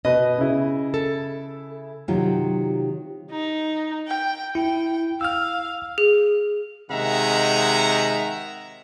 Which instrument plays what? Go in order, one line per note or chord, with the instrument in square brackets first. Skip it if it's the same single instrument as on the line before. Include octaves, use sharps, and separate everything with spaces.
[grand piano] B2 B4 [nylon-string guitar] D#5
[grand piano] C#3 E4
[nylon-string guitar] A4
C3 D#3 F#3 F4 G4
[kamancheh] D#4
G5
[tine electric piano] E4 [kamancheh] G5
[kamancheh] F5 [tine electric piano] E6 F6
[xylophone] G#4
[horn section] C3 D#3 G#3 E5 F#5 A#5